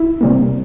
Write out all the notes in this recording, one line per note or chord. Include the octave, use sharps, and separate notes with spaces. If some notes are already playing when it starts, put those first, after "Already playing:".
Already playing: E4
C3 G3 A#3